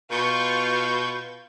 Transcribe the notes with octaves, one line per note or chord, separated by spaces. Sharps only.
B2 F4 C#6 G6